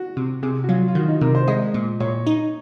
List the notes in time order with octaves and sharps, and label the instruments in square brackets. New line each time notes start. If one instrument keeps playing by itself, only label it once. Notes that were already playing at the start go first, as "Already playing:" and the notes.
Already playing: [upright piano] F#4
[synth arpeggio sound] C3
[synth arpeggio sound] C3 [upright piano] G#4
[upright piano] F#4
[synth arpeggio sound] F#3 [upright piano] F4
[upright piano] F4
[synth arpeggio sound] D#3 [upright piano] F#4
[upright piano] D#4
[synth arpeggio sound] C3 [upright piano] A#4
[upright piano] C5
[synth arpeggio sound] G#3 [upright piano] D#5
[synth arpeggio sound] A#2
[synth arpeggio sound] A#2 [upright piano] C#5
[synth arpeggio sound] D#4